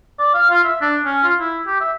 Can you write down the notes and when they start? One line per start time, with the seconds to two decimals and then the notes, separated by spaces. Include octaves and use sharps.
0.19 D5
0.34 F5
0.50 F4
0.64 E5
0.81 D4
1.05 C#4
1.24 F4
1.40 E4
1.67 G4
1.80 E5